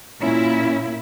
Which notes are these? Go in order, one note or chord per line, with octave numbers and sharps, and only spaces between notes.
A#2 C#4 E4